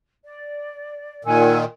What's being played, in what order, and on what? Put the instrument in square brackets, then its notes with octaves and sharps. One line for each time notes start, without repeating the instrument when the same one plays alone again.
[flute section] D5
[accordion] A#2 D#3 [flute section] F#5 G#5 E6